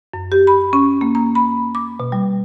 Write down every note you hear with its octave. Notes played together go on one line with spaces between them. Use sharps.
F#2
G4
B5
C#4
A#3
A#5
B5
D6
B2
G3